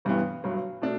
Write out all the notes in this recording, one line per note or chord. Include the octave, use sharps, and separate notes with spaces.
G1 G2 E3 G3 B3
G1 G2 F#3
B2 A3 D4